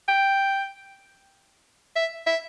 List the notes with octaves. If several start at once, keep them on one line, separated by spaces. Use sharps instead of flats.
G5
E5
E5